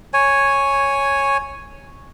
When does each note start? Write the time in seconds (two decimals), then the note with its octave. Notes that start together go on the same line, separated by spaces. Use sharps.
0.13 C#5 G#5